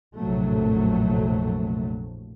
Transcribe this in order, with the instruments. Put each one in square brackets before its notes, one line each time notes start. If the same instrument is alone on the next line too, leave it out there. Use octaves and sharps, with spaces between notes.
[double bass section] A#1 F2 A2 C3 F#3 A3